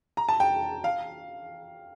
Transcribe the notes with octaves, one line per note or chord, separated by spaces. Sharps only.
A#5
A5
G5
F5